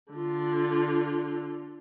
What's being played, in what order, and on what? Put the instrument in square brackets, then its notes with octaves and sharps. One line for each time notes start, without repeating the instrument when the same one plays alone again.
[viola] D3 F4